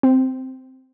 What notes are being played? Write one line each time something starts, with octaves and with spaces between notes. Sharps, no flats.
C4